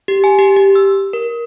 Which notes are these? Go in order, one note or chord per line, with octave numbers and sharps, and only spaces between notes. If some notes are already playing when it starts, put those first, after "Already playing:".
G4
G#5
G4
G4
E6
A#4